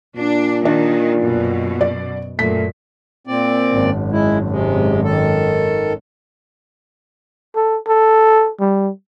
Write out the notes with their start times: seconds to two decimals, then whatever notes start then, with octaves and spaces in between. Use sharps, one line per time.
0.17 A#2 D4
0.65 D#3 D4
1.22 F#2 B2
1.81 D5
2.39 F#2 A#2 A3 B6
3.27 A#2 C4 D5
3.73 G#1 F#2
4.12 G#3 E4
4.50 C3 G#3
5.04 D#3 A4
7.55 A4
7.87 A4
8.60 G3